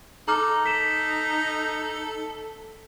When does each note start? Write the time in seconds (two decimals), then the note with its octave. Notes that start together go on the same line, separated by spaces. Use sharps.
0.28 D#4 A4 A#5 D6 F6
0.65 A4 B6 E7